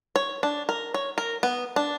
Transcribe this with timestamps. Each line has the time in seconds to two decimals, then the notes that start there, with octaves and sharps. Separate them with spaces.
0.16 C#5
0.43 D4
0.69 A#4
0.94 C#5
1.18 A#4
1.43 B3
1.76 D4